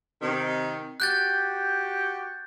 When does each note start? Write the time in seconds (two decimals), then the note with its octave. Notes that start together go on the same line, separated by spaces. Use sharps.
0.19 C3 D#3
1.00 F#4 G4 F#6 G6 A6